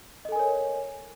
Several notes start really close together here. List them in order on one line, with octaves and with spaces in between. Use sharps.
D#5 A4 G#5 A#4 C#5